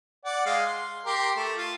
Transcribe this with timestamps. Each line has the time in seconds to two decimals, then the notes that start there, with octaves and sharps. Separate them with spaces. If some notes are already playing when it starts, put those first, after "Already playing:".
0.25 D5 F#5
0.46 G#3 F5
0.67 C6
1.06 G4 A#4 C6
1.36 A3
1.56 F4